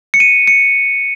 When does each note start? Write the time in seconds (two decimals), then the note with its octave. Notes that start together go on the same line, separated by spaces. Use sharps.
0.14 C#7
0.20 D#7
0.47 C#7